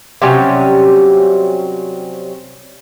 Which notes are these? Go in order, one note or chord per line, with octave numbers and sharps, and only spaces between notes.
C3 F#3 G3 C#4